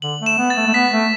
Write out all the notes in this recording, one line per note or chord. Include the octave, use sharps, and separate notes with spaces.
D3 F#7
A3
E7
B3
A6
A3
A3
B3 B6
A3